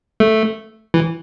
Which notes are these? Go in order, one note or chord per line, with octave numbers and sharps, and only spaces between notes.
A3
E3